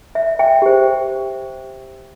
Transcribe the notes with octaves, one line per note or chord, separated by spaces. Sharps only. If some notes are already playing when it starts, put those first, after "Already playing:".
E5
E5 G5
G4 C5